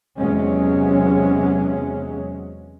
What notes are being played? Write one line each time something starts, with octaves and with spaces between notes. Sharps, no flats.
E2 C3 F#3 G#3 C#4